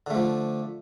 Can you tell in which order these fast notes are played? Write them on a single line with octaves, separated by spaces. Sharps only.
D3 A3 F3